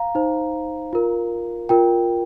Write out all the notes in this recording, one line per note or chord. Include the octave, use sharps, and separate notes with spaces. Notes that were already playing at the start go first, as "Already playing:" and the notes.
Already playing: F5 A#5
D#4 C5
F4 A#4
F4 A#4 G5